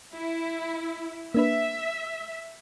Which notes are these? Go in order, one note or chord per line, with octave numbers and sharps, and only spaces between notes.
E4
A#3 D4 B4 E5